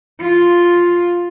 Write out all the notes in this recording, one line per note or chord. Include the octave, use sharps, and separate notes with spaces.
F4